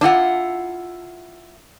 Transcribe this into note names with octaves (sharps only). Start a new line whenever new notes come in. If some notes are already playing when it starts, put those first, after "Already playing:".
D4 E4 F4 F#5